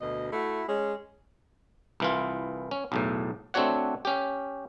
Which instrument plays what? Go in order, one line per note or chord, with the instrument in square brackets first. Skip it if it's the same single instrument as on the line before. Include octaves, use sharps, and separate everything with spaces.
[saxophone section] D2 B2 D#5
A3 E4 F#4
G#3 C#4 G#4
[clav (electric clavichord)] C2 E3 F4
C#4
B1 E2 A2
A3 C4 D4 F#4 C#5 F#5
C#4 G4